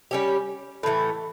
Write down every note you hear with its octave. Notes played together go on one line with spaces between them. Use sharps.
G3 C#4 G4
A2 E3 A3